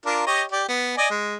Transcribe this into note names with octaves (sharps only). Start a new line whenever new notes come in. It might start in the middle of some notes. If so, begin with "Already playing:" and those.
D4 F4 A#4
G4 C#5 D#5
G4 D5
B3
D5 D#5 G#5
G#3